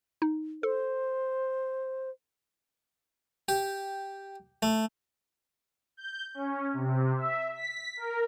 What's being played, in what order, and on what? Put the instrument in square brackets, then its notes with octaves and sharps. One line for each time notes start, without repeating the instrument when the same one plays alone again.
[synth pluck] D#4
[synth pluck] A4 [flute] C5
[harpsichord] G4
A3
[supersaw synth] G6
C#4
C3
E5
B6
A#4